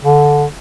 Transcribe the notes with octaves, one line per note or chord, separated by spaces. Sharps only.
D3